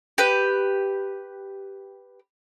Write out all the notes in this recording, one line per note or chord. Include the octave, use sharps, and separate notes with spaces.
G4 B4